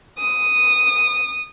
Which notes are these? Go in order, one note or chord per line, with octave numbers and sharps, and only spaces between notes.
D#6